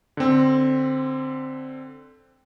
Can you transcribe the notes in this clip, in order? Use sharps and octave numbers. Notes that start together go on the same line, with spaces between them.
D3 C4